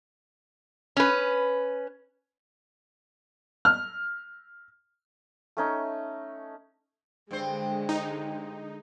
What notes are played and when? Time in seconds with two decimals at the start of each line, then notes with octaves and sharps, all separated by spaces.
0.97 C#4 B4
3.65 F6
5.57 A3 C#4 D#4
7.31 G2 D3 G#3 C4 C5
7.89 D#4